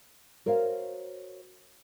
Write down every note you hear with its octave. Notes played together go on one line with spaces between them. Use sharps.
F#4 A#4 C5 C#5 F5